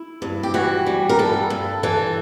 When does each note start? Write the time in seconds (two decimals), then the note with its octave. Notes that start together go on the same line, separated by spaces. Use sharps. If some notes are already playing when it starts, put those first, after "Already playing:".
Already playing: E4
0.22 G2
0.43 G4
0.54 E3 F#4
0.86 G3
1.09 A#4
1.19 G2 A4
1.50 G2
1.83 E3 A4